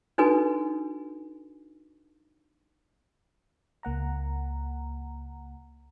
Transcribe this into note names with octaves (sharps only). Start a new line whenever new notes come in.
D4 D#4 F#4 A4 B4 G#5
C#2 A#3 F#5 A#5